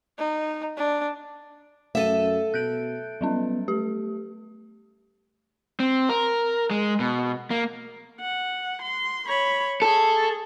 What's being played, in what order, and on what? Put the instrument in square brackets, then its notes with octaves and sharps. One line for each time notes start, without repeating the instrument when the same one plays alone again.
[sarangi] D#4
D4
[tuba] F#2 [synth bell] A3 D#7 [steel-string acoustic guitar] A4 E5
[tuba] B2 [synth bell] F#6 G6 D7
[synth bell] F#3 G3 C#4 [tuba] B3
[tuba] A3 [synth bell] G4
[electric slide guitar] C4
A#4
G#3
B2
A#3
[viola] F#5
C6
C#5 B5
[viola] G#4 C#6 [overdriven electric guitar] A4